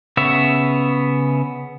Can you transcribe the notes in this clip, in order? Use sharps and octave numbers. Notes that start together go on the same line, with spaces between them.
C#3 B3 C#5 E5